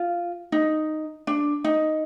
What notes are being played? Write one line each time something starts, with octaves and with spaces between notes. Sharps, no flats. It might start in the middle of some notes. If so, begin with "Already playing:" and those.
Already playing: F4
D#4
D4
D#4